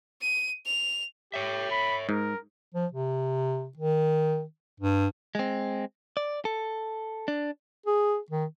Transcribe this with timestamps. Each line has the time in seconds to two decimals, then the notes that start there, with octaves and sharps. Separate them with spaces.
0.21 D#7
0.66 F7
1.34 G4 C#5 E5
1.71 B5
2.09 G#2 A#4
2.74 F3
2.92 C3
3.77 D#3
4.80 G2
5.35 G#3 C4
6.17 D5
6.45 A4
7.28 D4
7.86 G#4
8.30 D#3